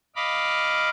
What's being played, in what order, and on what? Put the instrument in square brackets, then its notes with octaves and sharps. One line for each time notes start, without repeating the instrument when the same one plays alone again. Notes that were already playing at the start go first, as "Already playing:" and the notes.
[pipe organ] D#5 F5 B5 D6